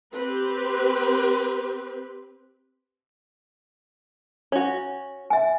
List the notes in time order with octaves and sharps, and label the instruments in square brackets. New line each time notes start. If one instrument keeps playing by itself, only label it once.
[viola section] C4 G4 B4
[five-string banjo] C#4 F#4 [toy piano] C#5
[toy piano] E5 G#5